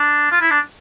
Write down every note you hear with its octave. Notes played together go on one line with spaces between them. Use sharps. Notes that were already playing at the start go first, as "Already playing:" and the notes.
Already playing: D4
F4
E4
D4